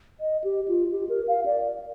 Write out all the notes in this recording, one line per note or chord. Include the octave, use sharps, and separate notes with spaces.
D#5
G4
F4
G4
A#4
F5
D5